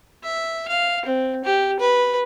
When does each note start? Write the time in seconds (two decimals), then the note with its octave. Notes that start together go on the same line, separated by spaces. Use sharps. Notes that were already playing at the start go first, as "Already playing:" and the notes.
0.24 E5
0.68 F5
1.05 C4
1.45 G4
1.80 B4